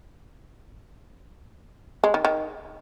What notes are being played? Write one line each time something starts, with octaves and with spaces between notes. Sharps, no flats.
G#3
D#3
D#3